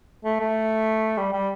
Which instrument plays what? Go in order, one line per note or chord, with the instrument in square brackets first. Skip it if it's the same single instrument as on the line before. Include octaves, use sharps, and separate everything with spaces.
[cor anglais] A3
A3
G3
G3